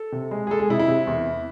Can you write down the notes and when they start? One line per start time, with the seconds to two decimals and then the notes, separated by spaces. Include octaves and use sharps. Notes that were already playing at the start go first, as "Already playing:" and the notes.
Already playing: A4
0.12 C3
0.31 G#3
0.47 G#4
0.50 G#3 A4
0.60 G#4
0.69 C3 E4
0.79 E4
0.88 C3
1.07 E2